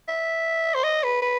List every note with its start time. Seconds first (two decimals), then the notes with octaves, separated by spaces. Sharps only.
0.08 E5
0.75 C5
0.84 D#5
1.03 B4
1.22 B4